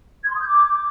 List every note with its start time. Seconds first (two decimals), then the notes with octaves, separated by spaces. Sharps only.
0.23 G#6
0.29 C6
0.35 D#6
0.41 G6
0.47 D6